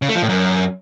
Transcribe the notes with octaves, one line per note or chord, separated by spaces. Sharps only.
C#3
A3
F3
A2
F#2